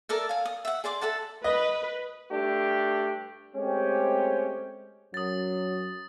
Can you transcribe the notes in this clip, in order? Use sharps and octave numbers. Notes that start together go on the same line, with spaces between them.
A4 A#4 D5 E5
F5 G#5
D#6
E5 F#5
G#4 D5 C6 D6
A4 E5 F#5 A5
B4 D#5
G2 A3 D4 G4
G#3 A3 C4 C#4 G4
F#2 F#3 D#6 A6